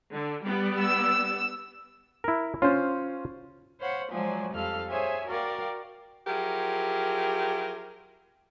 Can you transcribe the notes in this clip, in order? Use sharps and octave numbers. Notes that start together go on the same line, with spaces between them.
D3
G3 B3 D5
E6
E4 A#4
C#4 F4 C5
C5 C#5 F5 F#5 B5
F3 F#3 G#3 C5 D5 G#5
F2 G3 A4 F5 F6
G#4 C5 C#5 E5 G#5
F#4 A#4 D5 F5 G5
F3 F#3 E4 G4 G#4 A#4